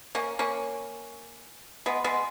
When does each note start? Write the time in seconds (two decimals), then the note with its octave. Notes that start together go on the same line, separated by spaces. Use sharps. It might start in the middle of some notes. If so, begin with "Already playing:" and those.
0.15 A#3 C#4
0.39 A#3 C#4
1.86 G#3 B3
2.04 G#3 B3